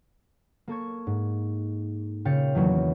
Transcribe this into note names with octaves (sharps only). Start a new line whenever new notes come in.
A#3 A4 C#6 G#6
G#2
A#2 C#3 F5 G5 A6 C#7
E2 D#3 E3 F#3 A#3